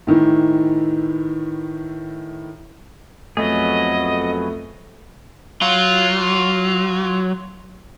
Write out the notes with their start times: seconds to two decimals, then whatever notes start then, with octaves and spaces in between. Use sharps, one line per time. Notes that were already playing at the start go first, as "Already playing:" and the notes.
0.07 A2 D#3 E3
3.37 F2 F#3 A3 B3 G#4 D#5
5.62 F#3 F4